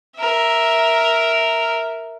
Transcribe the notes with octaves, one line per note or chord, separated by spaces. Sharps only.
A#4 E5